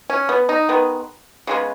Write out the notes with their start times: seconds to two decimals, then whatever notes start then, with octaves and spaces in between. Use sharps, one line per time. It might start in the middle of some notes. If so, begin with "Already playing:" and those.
0.10 C#4
0.29 B3
0.49 D#4
0.69 D#3 G#3 B3
1.47 C#3 G#3 B3